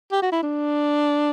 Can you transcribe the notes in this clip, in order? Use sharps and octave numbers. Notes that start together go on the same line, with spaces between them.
G4
F#4
E4
D4